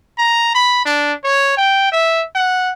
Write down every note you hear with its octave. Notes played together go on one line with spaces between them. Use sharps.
A#5
B5
D4
C#5
G5
E5
F#5